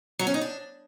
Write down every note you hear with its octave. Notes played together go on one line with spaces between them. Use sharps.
F#3
C#4
D#4
D4